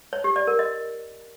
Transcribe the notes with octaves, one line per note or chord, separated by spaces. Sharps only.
C#5
G4
D5
A#4
D#5